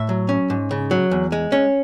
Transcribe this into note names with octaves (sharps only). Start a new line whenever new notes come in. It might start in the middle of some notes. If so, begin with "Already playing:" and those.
Already playing: A2 E5
F#3
C#4
G#2
C#3
F#3
E2
G#3
C#4